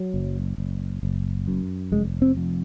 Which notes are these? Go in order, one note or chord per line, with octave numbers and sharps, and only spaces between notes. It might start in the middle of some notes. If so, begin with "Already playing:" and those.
Already playing: F#3
F#1
F#1
F#1
F#2
F1 G#3
C4
F2